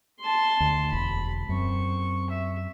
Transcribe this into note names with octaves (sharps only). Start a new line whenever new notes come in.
A5 C6
D2
E1 B5
F#2 C4 C#6
E5